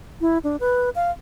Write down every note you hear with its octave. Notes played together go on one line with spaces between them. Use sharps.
E4
D4
B4
F5